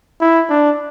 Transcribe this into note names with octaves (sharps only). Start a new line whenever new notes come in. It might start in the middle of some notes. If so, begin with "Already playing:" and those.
E4
D4